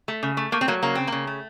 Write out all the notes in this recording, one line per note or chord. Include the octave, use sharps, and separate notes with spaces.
A3
C#3
A3
A3 A#3
C4
F#3 A#3
C#3 A#3
C#3 C4
C#3 A#3
A3